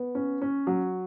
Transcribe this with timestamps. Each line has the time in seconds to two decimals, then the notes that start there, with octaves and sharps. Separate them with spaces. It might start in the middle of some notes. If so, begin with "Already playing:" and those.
Already playing: B3
0.15 C#4
0.42 C#4
0.67 F#3